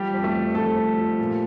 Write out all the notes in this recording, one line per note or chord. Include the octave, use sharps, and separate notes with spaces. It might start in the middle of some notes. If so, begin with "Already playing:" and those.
Already playing: F3 G3 G4
F2
A3 A4
F2
F2 A3 A4
F2
F3
A#2